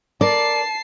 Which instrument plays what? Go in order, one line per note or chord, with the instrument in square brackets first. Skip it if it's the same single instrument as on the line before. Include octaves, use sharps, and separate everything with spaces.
[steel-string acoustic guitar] A#4 D5 [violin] A5 C7